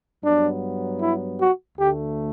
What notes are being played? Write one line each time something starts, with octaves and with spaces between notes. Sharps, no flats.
G2 F#3 B3 D4
E4
F#4
D2 D3 A3 G4